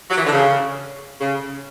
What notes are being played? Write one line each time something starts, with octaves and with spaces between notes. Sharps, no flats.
F#3
E3
D3
C#3
C#3